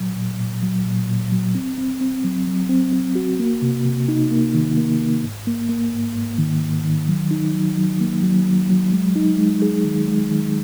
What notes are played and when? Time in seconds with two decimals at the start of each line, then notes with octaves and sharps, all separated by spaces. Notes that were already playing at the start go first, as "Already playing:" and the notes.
Already playing: A#2 F#3
0.16 A#2
0.40 A#2
0.63 F#3
0.86 A#2
1.08 A#2
1.32 F#3
1.55 C4
1.78 C4
2.01 C4
2.24 F#3
2.47 F#3
2.69 C4
2.93 C4
3.15 F#4
3.39 A#3
3.62 C3
3.85 C3
4.08 D#4
4.31 A#3
4.54 D#3
4.77 A#3
5.01 A#3
5.23 G#2
5.47 A#3
5.69 A#3
5.93 G#2
6.15 G#2
6.38 D#3
6.62 G#2
6.84 D#3
7.08 F#3
7.31 D#4
7.53 F#3
7.77 F#3
8.00 A#3
8.23 F#3
8.46 F#3
8.70 F#3
8.92 G#3
9.16 D#4
9.38 G#3
9.62 G#4
9.85 D#3
10.08 G#3
10.30 D#3